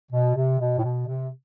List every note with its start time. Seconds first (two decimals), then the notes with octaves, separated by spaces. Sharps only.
0.11 B2
0.35 C3
0.59 B2
0.79 A2
0.83 B2
1.07 C3